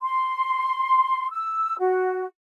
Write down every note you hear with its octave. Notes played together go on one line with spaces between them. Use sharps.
C6
E6
F#4